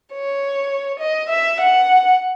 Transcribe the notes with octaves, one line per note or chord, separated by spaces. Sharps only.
C#5
D#5
E5
F#5